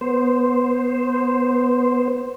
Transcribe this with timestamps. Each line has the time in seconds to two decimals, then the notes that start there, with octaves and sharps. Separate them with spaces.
0.01 B3 C5